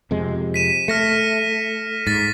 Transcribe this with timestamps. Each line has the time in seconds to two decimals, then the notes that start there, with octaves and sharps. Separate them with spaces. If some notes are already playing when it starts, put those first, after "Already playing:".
0.11 F2 C3 G#3
0.54 B6 D#7 E7
0.88 A3 F6 A#6 C#7
2.07 G#2 A6 B6